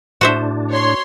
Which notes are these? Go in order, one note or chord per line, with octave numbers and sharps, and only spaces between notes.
A2 D4 F#4 C5 E5
C#5 C6